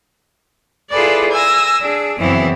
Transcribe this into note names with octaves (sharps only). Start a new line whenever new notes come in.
E4 F4 G#4 A4 B4 D5
G#5 E6 A#6
D4 G#4
F#2 C#3 E3 B3 C4 E4